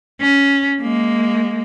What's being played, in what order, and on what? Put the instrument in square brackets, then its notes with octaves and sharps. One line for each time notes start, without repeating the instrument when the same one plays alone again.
[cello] C#4
G#3 A#3